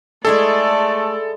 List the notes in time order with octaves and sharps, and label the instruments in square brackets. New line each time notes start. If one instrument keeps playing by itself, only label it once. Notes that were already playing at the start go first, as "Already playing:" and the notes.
[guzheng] G#3 E4 G#4 [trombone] A3 [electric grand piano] A4 [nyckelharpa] D5